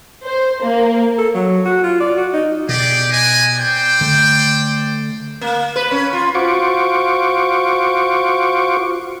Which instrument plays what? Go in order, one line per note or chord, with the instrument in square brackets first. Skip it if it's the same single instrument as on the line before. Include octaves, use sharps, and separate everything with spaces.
[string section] C5
A#3
[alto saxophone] A4
F#3
F#4
F4
D5
F#4
D#4
[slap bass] B2 [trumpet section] G4 G#4 D5
[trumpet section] B4 D#5 G#5
C5 D5 G5
[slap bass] D3 A3
[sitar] A#3
B4
C#4
F4
[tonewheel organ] F4 F#4 C5 C#6 D6